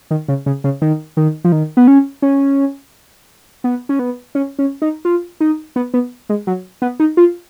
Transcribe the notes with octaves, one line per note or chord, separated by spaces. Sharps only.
D#3
C#3
C#3
C#3
D#3
D#3
F3
D#3
B3
C#4
C#4
B3
C#4
B3
C#4
C#4
D#4
F4
D#4
B3
B3
G#3
F#3
B3
D#4
F4